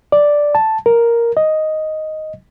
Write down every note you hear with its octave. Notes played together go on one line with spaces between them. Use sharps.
D5
A5
A#4
D#5